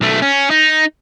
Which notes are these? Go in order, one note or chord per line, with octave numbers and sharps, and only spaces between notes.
B1 A3
C#4
D#4